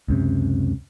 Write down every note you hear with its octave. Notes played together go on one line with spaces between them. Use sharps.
C#2 F#2 C3